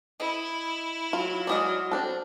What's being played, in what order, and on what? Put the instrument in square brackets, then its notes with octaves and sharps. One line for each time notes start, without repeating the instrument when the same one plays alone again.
[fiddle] E4 [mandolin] D#5
[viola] F#3 [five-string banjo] F4
[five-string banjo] G#3 C#4 D5 [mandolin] F#5 D#6 F6
[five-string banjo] C4 D4 A4